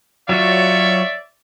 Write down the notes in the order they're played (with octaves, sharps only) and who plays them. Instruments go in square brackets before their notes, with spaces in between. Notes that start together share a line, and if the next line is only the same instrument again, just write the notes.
[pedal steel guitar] F#3 F4 F#4 [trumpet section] C#5 D5 E5